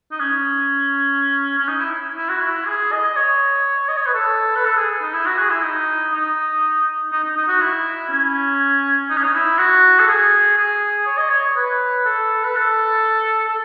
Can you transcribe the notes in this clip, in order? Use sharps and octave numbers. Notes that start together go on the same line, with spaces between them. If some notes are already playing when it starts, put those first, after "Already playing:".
D#4
C#4
C#4
D#4
E4
E4
F#4
E4
G#4
D#5
C#5
D#5
C#5
B4
A4
B4
A4
G#4
D#4
E4
F#4
G#4
E4
D#4
D#4
D#4
D#4
D#4
F#4
E4
C#4
D#4
C#4
D#4
E4
F#4
A4
G#4
G#4
C#5
D#5
C#5
B4
A4
B4
A4
A4